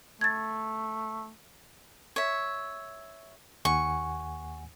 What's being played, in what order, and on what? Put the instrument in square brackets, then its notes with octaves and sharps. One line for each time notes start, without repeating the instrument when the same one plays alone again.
[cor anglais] A3 [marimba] G#6 A6
[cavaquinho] C#5 E5
[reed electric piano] D#2 F#5 G#5 [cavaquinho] C#6